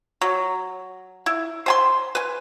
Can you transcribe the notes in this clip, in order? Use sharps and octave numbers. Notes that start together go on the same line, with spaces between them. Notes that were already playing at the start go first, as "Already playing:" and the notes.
F#3
E4
C5 G#5 C6
B4 G#5